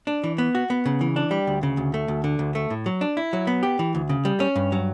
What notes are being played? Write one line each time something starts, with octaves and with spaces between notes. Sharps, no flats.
D4
E3
B3
F#4
B3
C#3
E3
D4
G3
D2
C#3
D2
A3
D2
D3
D2
A3
A2
F#3
D4
E4
F#3
B3
G4
E3
D2
C#3
G3
C#4
G2
F#3